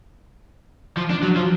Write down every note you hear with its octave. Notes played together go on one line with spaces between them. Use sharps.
F3
D4
F#3
F3